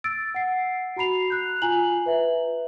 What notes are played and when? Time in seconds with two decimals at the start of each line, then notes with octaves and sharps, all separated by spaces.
0.04 E6 A6 D7
0.35 F#5 C7
0.96 F#4 A#5 B5 C7 F7
1.30 F#6 G6
1.62 F4 G#5 A#5 F#7
2.06 B4 E5